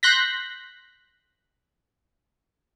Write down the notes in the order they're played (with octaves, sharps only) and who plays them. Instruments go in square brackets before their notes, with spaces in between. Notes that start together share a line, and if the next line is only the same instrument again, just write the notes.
[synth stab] C6 F#6 G6 A#6 B6